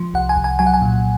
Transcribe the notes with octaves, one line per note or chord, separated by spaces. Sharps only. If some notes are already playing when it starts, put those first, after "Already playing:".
Already playing: F3
C2 F#5
G#5
C2
G#5
F#3 G#5
F#5
G#5
A#2